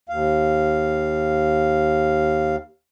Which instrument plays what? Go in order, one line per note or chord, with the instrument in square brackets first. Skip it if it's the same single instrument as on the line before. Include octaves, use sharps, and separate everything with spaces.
[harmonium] D#2 F5